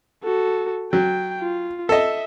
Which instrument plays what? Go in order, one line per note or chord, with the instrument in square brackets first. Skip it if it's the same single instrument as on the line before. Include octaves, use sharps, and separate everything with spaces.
[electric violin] F#4 A4
[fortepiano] F#3 [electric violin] G5
[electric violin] F4
[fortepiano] A4 D#5 [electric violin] E5